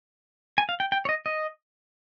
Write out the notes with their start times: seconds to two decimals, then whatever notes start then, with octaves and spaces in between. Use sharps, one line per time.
0.58 G#5
0.69 F5
0.80 G5
0.92 G5
1.05 C#5
1.09 D#5
1.26 D#5